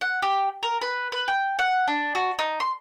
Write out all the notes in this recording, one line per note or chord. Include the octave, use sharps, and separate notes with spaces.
F#5
G4
A#4
B4
B4
G5
F#5
D4
F#4
D#4
C6